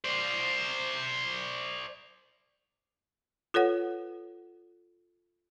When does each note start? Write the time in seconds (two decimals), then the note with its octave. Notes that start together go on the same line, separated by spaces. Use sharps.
0.05 C5 D5
3.54 F4 A4 B4 C#5 F#5